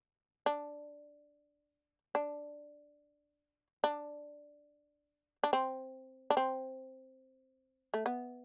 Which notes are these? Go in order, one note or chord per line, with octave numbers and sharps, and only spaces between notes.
D4
D4
D4
D4
C4
D4
C4
A3
B3